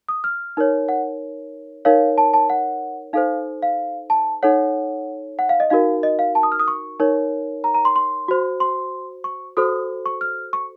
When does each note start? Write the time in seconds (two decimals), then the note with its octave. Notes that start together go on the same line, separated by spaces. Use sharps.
0.09 D#6
0.24 F6
0.57 D#4 A#4 C#5
0.89 F#5
1.85 D#4 A#4 C#5 F5
2.18 A5
2.33 A5
2.50 F#5
3.13 D#4 A4 C5 F5
3.62 F5
4.10 A5
4.43 D#4 A4 C#5 F#5
5.39 F#5
5.49 F5
5.60 D#5
5.70 D#4 F#4 A#4 F5
6.03 D#5
6.19 F5
6.35 A5
6.43 D#6
6.52 F6
6.59 D#6
6.68 C#6
7.00 D#4 A#4 C#5
7.64 A#5
7.75 A#5
7.85 C6
7.96 C6
8.28 F#4 C5
8.60 C6
9.24 C#6
9.57 F#4 A4 C5 D#6
10.06 C#6
10.21 F6
10.53 C#6